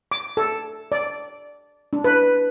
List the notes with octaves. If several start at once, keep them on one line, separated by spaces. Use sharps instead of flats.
D6
A4
D5
D4
B4